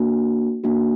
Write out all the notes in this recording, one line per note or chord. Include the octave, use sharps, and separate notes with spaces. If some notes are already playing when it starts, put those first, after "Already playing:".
Already playing: A#3 D4 F#4
A#3 D4 F#4